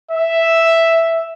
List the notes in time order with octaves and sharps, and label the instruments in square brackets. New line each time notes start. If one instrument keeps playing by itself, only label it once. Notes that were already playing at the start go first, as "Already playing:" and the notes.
[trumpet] E5